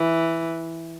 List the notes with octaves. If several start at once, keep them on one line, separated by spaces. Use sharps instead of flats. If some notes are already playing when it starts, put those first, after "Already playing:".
Already playing: E3